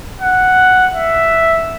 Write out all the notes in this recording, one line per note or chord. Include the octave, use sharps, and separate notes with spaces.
F#5
E5